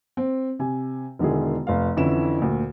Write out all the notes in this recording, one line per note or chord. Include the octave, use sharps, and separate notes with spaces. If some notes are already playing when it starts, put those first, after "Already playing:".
C4
C3 G#5
E1 D3 D#3 E4 G#4
F1 F5
F2 D3 E3 C#4 E4 E7
D2 A#2